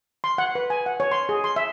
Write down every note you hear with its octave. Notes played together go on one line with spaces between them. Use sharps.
C6
F#5
B4
G#5
F#5
C#5
C6
G#4
C6
E5